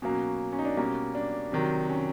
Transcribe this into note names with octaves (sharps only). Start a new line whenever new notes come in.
B2 F#3 A#3 C#4
C#4
D#4
D4
B2 G3 A#3 C#4
D4
C3 D#3 F#3
C#4